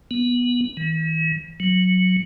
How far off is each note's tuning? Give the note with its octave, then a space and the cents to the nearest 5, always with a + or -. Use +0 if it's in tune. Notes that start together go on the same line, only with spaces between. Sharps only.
B3 -15
E3 -45
F#3 -5